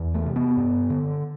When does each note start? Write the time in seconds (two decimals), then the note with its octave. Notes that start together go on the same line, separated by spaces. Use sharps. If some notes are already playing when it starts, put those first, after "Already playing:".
Already playing: E2
0.14 A3
0.25 C3
0.36 B3
0.57 G2
0.90 D3